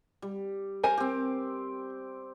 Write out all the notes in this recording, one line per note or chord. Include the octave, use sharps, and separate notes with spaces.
G3
A#4 C5 G#5
C4 G4